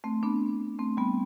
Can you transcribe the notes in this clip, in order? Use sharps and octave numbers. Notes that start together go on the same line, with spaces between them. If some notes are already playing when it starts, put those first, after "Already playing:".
A3 C4
B3 D4
A3 C4
G3 B3